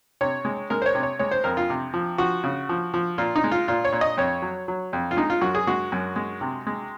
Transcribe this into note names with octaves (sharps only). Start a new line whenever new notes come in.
C3 C#5
G#3
G#3 A#4
C5
C#5
C3
C#5
G#3 C#5
C5
F2 A#4
F4
C3
F3
F3 F#4
C#3
F3
F3
A#2 F4
D#4
G#3
F4
A#2 F4
C#5
A#2
D#5
F2 C#5
F#3
F#3
F2
F4
G#3 D#4
F4
F#2 F#4
G#4
G#3 F#4
F#2
G#3
C3
G#3